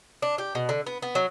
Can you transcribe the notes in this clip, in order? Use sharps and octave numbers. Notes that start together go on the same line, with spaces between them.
D4
G4
B2
D3
B3
B3
F#3